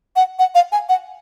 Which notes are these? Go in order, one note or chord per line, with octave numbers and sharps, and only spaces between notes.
F#5
F#5
F5
G#5
F#5